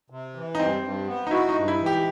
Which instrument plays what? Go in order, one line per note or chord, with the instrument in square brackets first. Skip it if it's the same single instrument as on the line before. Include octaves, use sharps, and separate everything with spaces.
[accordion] C3
E3
[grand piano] D#4
[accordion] G2 [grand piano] C4
[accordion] G2
B3
[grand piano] D#4
[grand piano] E4 [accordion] F#4
[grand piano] D#4
[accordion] G2
[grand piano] E4
[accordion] E3
[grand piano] G4